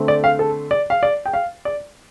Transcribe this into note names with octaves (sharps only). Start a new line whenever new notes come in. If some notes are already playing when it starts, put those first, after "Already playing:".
Already playing: D3 A3 C4
D5
F5
A4
D5
F5
D5
G5
F5
D5